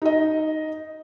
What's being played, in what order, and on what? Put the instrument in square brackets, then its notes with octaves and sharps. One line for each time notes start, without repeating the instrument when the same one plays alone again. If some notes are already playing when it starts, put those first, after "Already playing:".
[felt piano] D#4 D#5